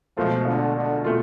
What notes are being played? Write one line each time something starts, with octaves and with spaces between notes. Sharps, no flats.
C#2 B2 F3 A3 F4
D3
D3
B2 A3 F4